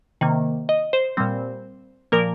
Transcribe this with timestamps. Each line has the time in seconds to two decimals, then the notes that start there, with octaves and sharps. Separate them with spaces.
0.21 C3 D#3 A#3
0.69 D#5
0.93 C5
1.17 A#2 G3 C4
2.12 A#2 F3 A#3 A#4